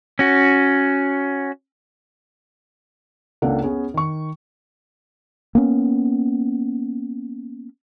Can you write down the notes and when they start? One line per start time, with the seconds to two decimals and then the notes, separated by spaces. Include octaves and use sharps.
0.19 C#4 F#4
3.42 C#2 C#3 A#3 D4 A4 F#5
3.63 B3 C#4 G#4
3.94 D#3 C#6
5.55 A#3 B3 C#4